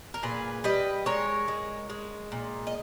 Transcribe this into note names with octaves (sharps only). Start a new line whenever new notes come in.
A#4
A#2 G#4 B4
G3 B4 D#5
G#3 A#4 C#5
G#3
G#3
A#2
D#5